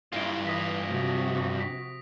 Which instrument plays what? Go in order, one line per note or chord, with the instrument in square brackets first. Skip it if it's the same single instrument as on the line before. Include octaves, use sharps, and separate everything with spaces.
[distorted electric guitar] G2 F4 [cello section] E4 [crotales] A#6 D7
[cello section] E3 [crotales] D#6 A#6 B6
[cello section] C3 F3 F#4
[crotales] B6